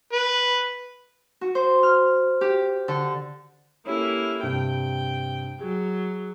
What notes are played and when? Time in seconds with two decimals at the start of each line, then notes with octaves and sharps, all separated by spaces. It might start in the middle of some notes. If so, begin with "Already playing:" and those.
0.13 B4
1.41 F#4
1.55 C5
1.83 F6
2.41 G4
2.88 D3
3.86 A#3 C#4 E4 G4 A4
4.43 G2 C3 G5
5.60 F#3 G#4